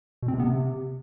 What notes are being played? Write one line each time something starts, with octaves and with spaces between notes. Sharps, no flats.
B2
C4
C3
B3
C3